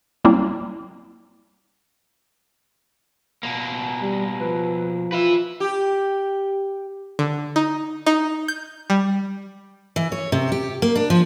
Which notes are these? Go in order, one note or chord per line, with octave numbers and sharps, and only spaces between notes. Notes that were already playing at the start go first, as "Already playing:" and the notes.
F#3 G3 A#3 C4 C#4 E4
B2 A#3
G3
F3 B4
F4 B4 E5
G4
D3
D#4
D#4
G6
G3
E3
C#5
C3
G4
A#3
D4
F3